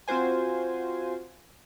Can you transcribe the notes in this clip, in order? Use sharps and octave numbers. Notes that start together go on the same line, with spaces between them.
C4 F4 F#4 C5 G#5